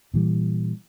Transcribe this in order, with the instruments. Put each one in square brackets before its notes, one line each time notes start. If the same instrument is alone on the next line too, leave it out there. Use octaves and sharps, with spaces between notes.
[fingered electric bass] A#2 E3 G3